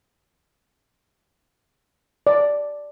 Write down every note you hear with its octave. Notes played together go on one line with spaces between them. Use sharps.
D5